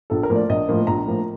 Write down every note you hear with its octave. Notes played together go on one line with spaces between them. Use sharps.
A#1 A4
A#4
A2 F3 A#3
D5
A#1 D#5
A2 F3 A#3
A#1 A#5
A2 F3 A#3